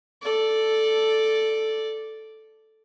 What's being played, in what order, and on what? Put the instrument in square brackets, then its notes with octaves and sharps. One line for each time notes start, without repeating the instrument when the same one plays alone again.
[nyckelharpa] A4 D5